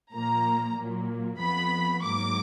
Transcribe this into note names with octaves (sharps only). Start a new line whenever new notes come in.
A#2 F3 A#3 A#5
A#2 F#3 A#3
F2 F3 B3 B5
G#2 F#3 A#3 D6